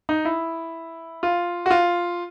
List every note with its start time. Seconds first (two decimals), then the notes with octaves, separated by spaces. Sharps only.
0.09 D#4
0.25 E4
1.23 F4
1.66 F#4
1.71 F4